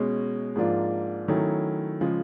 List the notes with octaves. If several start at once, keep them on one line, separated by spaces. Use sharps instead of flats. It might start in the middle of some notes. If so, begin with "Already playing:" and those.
Already playing: B2 G#3 C#4
G#2 F3 A#3 D4 F4
D#3 F#3 A3 C#4 E4
C#3 F3 G#3